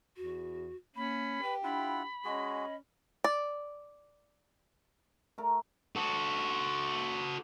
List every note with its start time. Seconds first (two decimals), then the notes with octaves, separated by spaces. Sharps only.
0.17 E2 F#4
0.96 A#3 C#4 B5
1.42 G4 B4
1.64 D4 E4 F4 F#5 B5
2.25 G#3 C#4 F#4 G#4 D#5
3.24 D5
5.38 A3 A#4 A#5
5.96 F#4 A4